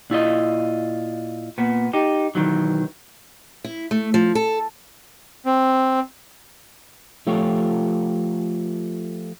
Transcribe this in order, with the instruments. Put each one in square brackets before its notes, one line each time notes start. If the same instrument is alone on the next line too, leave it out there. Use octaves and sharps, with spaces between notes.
[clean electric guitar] A#2 E4 F4 D#5
A#2 B3
D#4 G4
B1 D#3 E3 F#3
[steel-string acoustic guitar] E4
A3
F3
A4
[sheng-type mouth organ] C4
[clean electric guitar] F3 A3 F4 G4 C#5